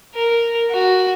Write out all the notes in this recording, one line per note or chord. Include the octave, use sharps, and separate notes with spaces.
A#4
F#4